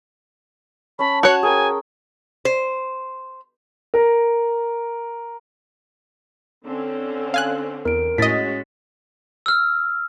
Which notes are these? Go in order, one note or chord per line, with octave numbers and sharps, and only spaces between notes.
C#4 A5 B5
F#4 C#5 F#6
G#4 A#4 G5 G#5
C5
A#4
D3 C4 C#4
F5 G#5 F#6
E2 A#4 D7
A2 G#3 C#4 F#4 D#5 A6 B6
E6 F6